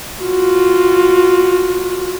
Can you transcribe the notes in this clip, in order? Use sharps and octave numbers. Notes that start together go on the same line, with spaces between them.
F4 F#4